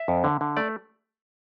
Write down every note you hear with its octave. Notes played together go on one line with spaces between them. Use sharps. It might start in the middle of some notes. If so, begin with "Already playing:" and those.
Already playing: E5
F2
D3
D3
A3 D5